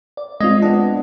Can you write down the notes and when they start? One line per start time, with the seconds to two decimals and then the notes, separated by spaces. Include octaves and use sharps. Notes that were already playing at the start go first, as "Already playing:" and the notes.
0.17 D5
0.41 G#3 C4 F4 D#5
0.62 B3 D4